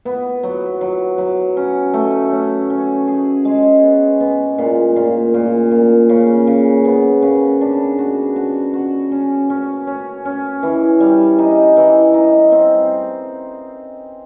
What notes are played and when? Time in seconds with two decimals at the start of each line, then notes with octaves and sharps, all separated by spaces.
0.05 B3
0.43 F#3
0.81 F#3
1.18 F#3
1.57 C#4
1.94 A3
2.32 C#4
2.70 C#4
3.08 G#4
3.45 G#3
3.83 B3
4.20 B3
4.58 A#2
4.96 A#2
5.34 A#2
5.71 A#2
6.09 C#3
6.47 C#3
6.85 B3
7.22 C#3
7.61 D4
7.99 F#4
8.36 F#4
8.73 F#4
9.12 C#4
9.50 C#4
9.87 C#4
10.25 C#4
10.63 E3
11.00 G3
11.39 D#4
11.77 E3
12.14 D#4
12.52 C4